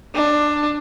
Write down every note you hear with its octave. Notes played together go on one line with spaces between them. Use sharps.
D4